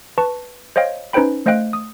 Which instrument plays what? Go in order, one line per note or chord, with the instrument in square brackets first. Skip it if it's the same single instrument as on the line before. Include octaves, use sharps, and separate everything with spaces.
[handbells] B4 A5 C#6
C5 C#5 D#5 F5 G5
C#4 D#4 B4 C5 G5 B5
A3 C5 D#5 F5 G5 F#6
D#6